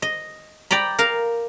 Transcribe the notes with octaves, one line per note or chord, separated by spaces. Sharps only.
D#5
D5 G5 A#5 B5
A#4 F5